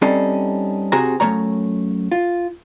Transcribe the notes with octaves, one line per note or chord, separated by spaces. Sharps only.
G3 C4 C#4 D#4 A4
C3 F#4 G#4 C5 A#5
F#2 F3 A3 C#5 A#5
F4